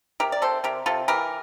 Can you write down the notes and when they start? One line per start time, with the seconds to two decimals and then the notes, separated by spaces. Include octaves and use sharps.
0.20 C3 G4 A#4
0.32 D5
0.42 C3 A4 C5
0.64 C3 G4 A#4
0.86 C3 F4 A4
1.08 E3 G4 A#4